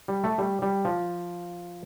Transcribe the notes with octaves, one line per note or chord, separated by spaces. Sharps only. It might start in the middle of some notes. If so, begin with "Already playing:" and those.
G3
A3
G3
G3
F3